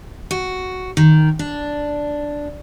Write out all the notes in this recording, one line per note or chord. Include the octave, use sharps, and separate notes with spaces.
F#4
D#3
D4